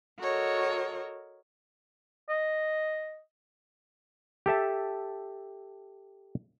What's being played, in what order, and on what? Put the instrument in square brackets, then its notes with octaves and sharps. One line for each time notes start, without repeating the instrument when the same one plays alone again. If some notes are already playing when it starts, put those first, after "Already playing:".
[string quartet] F#4 A4 A#4 C#5 D#5
[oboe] D#5
[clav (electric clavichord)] G4 A4 E5 A5